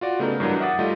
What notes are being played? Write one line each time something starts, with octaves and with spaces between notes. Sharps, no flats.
F4 F#4 D5
C#3 A3 B3 D#4 A#4
G2 E3 F#3 D4 A#4
E5 F#5 D6 D#6 A6
G3 A3 D#4 F4 D#5